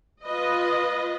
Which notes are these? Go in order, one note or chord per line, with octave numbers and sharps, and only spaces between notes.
F4 B4 D#5